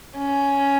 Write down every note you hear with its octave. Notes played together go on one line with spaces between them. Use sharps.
C#4